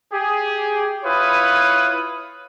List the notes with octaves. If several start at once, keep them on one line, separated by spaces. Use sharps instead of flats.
G4 G#4
E4 F4 B4 C#5 D#6